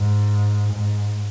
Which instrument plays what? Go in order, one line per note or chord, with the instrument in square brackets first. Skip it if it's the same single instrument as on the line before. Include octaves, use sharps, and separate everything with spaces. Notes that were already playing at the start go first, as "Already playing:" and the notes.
Already playing: [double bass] G#2
G#2